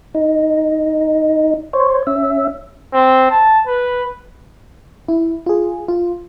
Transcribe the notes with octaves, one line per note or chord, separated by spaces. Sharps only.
D#4
C5 C#5
C#4 E5
C4
A5
B4
E4
F4 G#4
F4